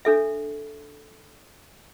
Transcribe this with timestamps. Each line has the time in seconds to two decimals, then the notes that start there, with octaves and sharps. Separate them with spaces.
0.05 D4 A4 E5